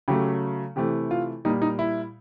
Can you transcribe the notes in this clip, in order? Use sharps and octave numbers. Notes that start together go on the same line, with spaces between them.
C#3 F#3 A3 G4
C3 E3 A3 G4
F4
A#2 G3 D#4
D#4
E4